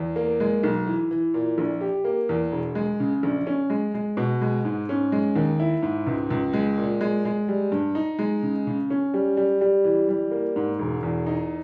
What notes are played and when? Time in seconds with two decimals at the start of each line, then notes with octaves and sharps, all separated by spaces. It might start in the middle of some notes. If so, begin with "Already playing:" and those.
Already playing: E2
0.16 A#3
0.40 G#3
0.63 B1
0.87 E3
1.11 E3
1.34 A#2
1.58 A#1
1.81 G4
2.04 A#3
2.29 E2
2.52 E1
2.75 G#3
3.00 C#3
3.23 A#1
3.47 C#4
3.70 G#3
3.94 G#3
4.17 B2
4.41 G#3
4.65 G#2
4.89 C#4
5.12 G#3
5.36 D#2
5.60 E4
5.83 G#2
6.07 C#2
6.31 C#2
6.53 G#3
6.78 A#2
7.01 G#3
7.25 G#3
7.48 G3
7.72 G2
7.95 D#4
8.19 G#3
8.43 C#3
8.67 C#3
8.90 C#4
9.14 G3
9.37 G3
9.61 G3
9.84 E3
10.09 G3
10.31 A#3
10.56 G#2
10.79 E1
11.03 E2
11.26 D#4